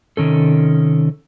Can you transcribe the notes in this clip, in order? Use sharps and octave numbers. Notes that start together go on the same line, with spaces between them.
C3 D#3 C#4 A4